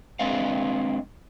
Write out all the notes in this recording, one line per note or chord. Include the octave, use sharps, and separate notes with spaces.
G#3 C4 D4 B4 D#5 F5